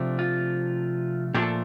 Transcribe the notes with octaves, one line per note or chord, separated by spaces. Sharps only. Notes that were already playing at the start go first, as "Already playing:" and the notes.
Already playing: C3 F3 A3 D4
F4
A#2 F3 A3 D4 G4
A4